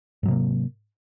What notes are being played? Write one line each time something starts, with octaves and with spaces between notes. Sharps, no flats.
G#2 C3 F#3 A#3